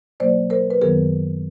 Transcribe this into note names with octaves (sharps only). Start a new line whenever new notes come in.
B2 F#3 A#3 C5 D5
A#4 C5
B4
F#2 D#3 F#3 B3 G#4 A#4